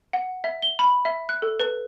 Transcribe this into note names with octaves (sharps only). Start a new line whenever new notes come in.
F#5
E5
G7
B5
E5
F#6
A4
B4